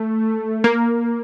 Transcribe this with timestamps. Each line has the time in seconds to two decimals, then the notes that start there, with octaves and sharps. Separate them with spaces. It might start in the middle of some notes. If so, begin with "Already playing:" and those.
Already playing: A3
0.64 A#3